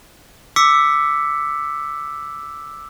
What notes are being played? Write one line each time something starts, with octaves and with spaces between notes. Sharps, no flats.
D6 E6 B6 C#7